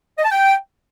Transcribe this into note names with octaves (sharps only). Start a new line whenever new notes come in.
D#5
A5
G5